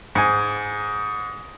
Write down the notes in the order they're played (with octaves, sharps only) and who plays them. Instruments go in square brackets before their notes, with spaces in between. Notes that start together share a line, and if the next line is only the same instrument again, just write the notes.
[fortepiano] G#2 G#5